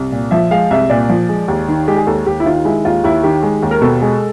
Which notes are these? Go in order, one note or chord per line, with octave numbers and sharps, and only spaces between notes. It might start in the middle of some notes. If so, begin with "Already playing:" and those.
Already playing: C2
A#2
F3 E5
G#3 F5
C2 E5
A#2 D5
F3
G#3
D#2
D#3
G#3 G4
G#4
D#2 A4
D#2 G4
E4
D#3 F4
G#3 E4
D#2 F4
D#2 E4
D#3 G4
G#3
D#2
A#4
B2 A4
G#3